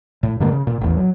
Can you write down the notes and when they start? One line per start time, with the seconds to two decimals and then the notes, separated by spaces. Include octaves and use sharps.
0.23 A2
0.40 G2 D3 G#3 A#3
0.52 C#3
0.67 A#2
0.81 A1 E2
0.97 F#3